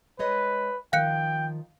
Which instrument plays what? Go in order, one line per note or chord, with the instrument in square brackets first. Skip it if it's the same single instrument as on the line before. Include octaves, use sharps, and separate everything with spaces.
[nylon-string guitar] G#3 C#5 D#5 [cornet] B4
[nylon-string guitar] D#3 F3 [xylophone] F5 F#6 C#7 [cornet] G5